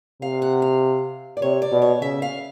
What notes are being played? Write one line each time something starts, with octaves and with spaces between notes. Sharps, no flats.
C3 F5
F#5
F5
D5
C3 C#5
D5
B2
C#5
C#3 E5
F5